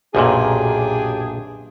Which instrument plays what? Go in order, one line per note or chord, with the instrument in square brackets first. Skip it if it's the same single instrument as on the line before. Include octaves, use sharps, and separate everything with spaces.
[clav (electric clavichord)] B1 F#2 A#2 [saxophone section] D4 G4 G#4